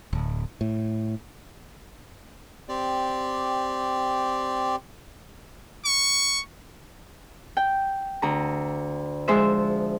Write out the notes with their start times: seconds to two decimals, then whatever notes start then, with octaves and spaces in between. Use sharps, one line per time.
0.13 D1
0.61 A2
2.69 C4 G4 D5
5.85 C#6
7.57 G5
8.22 D2 A#5
9.28 F3 G#3 C5 E5